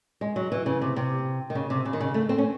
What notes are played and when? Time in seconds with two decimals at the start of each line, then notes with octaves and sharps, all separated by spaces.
0.21 G#3
0.36 F#3
0.52 E3
0.66 C#3
0.82 C3
0.96 C3
1.50 D#3
1.55 C#3
1.70 C3
1.85 C#3
1.93 D#3
2.01 C#3
2.14 A3
2.29 C4
2.38 C#4